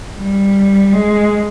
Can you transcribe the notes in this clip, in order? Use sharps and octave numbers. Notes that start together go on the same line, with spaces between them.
G3
G#3